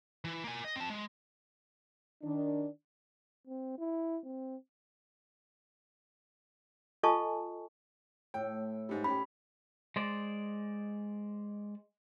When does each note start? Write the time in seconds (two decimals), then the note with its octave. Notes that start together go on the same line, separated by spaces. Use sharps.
0.25 E3
0.44 A#3 G#5
0.64 D#5
0.76 C4 A5
0.90 G#3
2.23 D#3 D4
3.47 C4
3.78 E4
4.25 C4
7.03 F4 A4 D#5 G#5 A5 C#6
8.34 A2 G5
8.89 G#2 G3
9.04 C#4 G4 B5
9.96 G#3 C5 D5